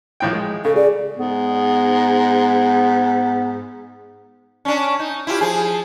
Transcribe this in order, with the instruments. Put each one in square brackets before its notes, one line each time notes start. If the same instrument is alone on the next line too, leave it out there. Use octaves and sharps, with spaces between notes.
[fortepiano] A#1 A2 G5
G#3
[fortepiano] C#3 [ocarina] A4
[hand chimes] G#4 [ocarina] D5
[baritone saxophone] G#2 [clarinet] B3
[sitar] C#4 D4
D#4
E4 F4 G4
F3 G#4